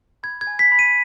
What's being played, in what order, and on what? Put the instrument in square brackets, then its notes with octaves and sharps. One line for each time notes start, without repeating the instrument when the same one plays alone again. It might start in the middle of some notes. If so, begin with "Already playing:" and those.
[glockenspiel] B5 G#6
G#6
G#5
B6
B5
D#7